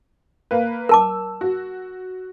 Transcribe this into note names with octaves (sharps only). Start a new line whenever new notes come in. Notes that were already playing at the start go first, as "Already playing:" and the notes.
A#3 B4
A#4 A5 D6 E6
F#4